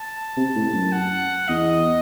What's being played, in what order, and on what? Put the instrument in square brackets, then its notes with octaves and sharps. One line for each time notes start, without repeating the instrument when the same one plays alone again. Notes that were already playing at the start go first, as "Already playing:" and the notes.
Already playing: [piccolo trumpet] A5
[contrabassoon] C3
A2
F#2
[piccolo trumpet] F#5
[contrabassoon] E2 [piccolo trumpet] D#5